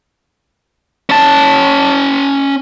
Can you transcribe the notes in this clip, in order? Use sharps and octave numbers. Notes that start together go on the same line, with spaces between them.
C#4 A5